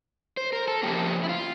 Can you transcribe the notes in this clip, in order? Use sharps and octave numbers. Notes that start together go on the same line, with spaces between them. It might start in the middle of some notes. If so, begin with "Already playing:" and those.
C5
A#4
A4
E2 C#3 F3 A#3 G4
E4
F4